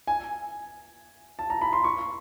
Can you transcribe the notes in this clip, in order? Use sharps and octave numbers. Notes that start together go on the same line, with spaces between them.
G#5
A5
A#5
B5
C6
C#6